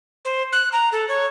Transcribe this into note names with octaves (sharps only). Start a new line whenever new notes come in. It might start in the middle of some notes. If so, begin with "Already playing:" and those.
C5
F#6
A#5
A4
C#5